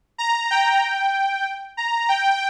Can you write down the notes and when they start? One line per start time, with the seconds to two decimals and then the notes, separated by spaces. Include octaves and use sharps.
0.18 A#5
0.51 G5
1.77 A#5
2.09 G5